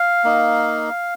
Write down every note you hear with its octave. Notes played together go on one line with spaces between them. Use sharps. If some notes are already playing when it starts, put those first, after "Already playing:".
Already playing: F5
A#3 D#4